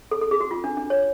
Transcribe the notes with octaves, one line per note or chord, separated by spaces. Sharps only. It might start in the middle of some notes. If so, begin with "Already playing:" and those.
A4
A4
G#4
F#4
F4
D4
D4
C#5